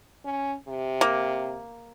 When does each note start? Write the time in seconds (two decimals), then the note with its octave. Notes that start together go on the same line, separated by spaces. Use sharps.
0.25 C#4
0.67 C3
1.01 A#3